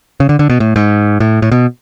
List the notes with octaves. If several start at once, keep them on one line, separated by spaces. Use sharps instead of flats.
C#3
D3
D3
B2
A2
G#2
A2
A2
B2